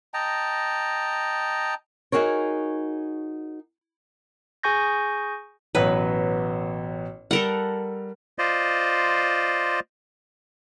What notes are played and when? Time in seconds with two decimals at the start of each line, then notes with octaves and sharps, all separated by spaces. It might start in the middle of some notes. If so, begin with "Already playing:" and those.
0.14 D#5 G5 A5 A#5
2.12 D#4 F#4 G#4 A#4 C#5
4.63 G#4 G#5 C#6 G6 A#6
5.75 A1 B2 F#3 B4
7.31 G3 A4 A#4 F#5
8.38 F4 C5 D5 D#5